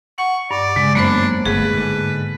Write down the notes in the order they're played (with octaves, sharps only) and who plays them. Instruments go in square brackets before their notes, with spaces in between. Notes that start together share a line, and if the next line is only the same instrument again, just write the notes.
[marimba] F#5 [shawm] C#6
[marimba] G2 [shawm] D5
[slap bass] C#3 [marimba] G#3
[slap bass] F#2 F#3 [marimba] A#3 B3 C5 [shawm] D4
[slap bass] G1 A3 [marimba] G#4 [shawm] B4
[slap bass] G#2 D3